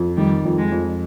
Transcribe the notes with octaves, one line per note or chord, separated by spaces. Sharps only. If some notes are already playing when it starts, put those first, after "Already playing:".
Already playing: F2
D#3 G3
F2
G#3
F2